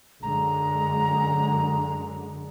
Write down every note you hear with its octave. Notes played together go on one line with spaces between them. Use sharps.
F#2 D3 G#3 A#5